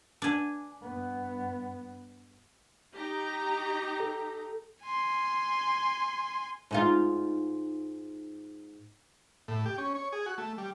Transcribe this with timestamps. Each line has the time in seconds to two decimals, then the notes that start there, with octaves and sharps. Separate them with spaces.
0.22 D4 G#5
0.82 G2 B3
2.96 D#4 G4 A#5
4.00 A4
4.86 G#5 C6
6.71 G#2 D#4 F4
9.48 A2
9.66 G4
9.78 C#4
9.95 C#5
10.12 G#4
10.26 F#4
10.38 A3
10.58 G3